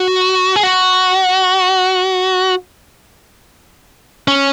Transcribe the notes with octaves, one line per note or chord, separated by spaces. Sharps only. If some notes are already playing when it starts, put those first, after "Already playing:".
Already playing: F#4
G#4
F#4
C#4